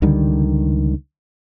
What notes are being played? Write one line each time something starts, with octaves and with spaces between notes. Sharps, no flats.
C#2 D3 D#3 G3